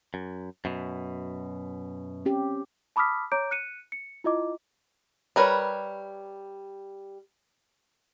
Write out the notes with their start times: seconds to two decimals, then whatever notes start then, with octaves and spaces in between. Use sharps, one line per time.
0.14 F#2
0.65 F#2 B2
2.25 C4 C#4 G4
2.96 A5 B5 D6 D#6 F6 B6
3.32 C#5 A#5 D6 G6 D7
3.51 F#6 C#7 D#7
3.92 C#7
4.24 E4 F4 D#5 D6
5.36 G3 A#4 B4 C#5